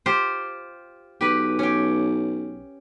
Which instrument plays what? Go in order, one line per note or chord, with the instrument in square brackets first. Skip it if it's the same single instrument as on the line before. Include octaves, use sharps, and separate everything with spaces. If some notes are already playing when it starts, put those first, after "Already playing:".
[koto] F4 G4 C5
[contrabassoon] B1 [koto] G4 B4
[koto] C#4 G4